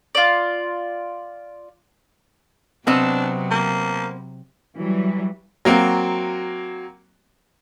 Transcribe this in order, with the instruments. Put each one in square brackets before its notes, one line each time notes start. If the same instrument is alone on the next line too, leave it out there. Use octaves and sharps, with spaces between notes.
[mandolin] F4 D5
[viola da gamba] C3 F#3 [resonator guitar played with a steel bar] B3 C4 D#5 [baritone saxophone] D4
[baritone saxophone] A#3
[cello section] E3 F#3 G3
[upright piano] F#3 A#3 C4 F#4